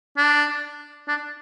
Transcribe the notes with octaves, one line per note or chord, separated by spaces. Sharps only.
D4
D4